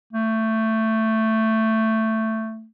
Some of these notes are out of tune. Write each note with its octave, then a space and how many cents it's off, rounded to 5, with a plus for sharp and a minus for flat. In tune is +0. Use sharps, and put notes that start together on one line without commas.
A3 +10